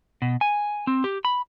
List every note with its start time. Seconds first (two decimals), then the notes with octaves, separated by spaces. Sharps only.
0.22 B2
0.41 G#5
0.87 C4
1.04 G4
1.25 B5